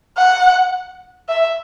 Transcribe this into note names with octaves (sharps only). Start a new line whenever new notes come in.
F#5
E5